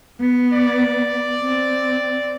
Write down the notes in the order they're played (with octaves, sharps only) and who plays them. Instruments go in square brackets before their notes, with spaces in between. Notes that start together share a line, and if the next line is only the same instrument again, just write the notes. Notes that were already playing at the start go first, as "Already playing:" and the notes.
[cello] B3
[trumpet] D5
[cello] C4